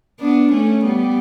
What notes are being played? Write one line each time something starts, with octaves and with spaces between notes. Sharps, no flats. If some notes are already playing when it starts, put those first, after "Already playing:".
B3 D4
A3 C#4
G3 B3